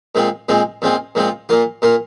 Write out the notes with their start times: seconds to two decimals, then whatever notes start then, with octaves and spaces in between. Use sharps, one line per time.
0.15 A#2 G#3 C4 F4
0.49 A#2 G#3 C4 F4
0.82 A#2 G#3 C4 F4
1.15 A#2 G#3 C4 F4
1.49 A#2 A#3 F4
1.82 A#2 A#3 F4